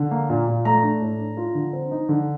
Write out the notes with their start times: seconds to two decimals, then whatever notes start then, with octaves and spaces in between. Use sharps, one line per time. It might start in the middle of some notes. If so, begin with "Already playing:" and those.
Already playing: D3
0.11 A#3
0.29 A#2
0.48 A#2
0.65 A3 A#5
0.83 D4
1.01 A2
1.19 D4
1.37 F4
1.55 D3
1.73 C4
1.91 D#4
2.09 D3